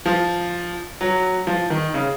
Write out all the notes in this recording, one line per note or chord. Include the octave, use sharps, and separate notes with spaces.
F3
F#3
F3
D#3
C#3